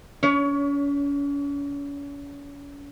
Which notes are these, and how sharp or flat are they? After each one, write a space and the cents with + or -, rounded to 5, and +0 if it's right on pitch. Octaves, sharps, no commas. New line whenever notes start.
C#4 +40 C#5 +25